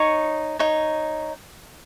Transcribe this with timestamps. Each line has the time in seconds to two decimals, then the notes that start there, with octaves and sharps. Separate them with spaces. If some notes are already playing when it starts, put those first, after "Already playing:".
Already playing: D#4 C#5 C#6
0.59 D#4 C#5